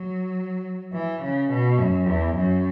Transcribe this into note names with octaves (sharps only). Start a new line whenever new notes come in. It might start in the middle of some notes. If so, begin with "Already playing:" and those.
Already playing: F#3
E3
C#3
B2
F#2
E2
F#2